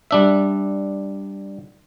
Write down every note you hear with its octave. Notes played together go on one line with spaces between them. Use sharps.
G3 D4 E5